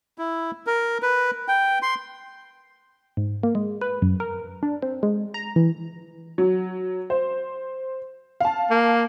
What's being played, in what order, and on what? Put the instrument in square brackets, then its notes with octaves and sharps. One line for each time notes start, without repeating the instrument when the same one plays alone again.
[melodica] E4
A#4
B4
G5
C6
[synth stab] G#2
A#3
G#3
B4
F#2
A#4
D4
C4
G#3
A#5
E3
[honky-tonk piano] F#3
C5
F5 A5
[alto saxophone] A#3